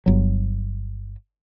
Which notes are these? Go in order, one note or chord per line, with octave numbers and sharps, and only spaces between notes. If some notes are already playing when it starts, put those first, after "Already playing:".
G1 F#3